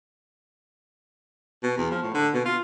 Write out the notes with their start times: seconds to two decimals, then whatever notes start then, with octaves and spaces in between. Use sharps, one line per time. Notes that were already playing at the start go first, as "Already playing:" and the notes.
1.63 B2
1.77 E2
1.91 F3
2.03 A2
2.14 D3
2.34 B2
2.45 F4